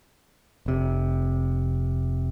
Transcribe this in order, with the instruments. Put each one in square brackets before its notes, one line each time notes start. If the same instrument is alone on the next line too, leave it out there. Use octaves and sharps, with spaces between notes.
[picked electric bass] F1 C3